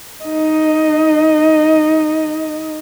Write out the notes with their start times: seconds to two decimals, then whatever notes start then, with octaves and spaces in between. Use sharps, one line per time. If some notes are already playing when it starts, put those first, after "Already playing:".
0.24 D#4 D#5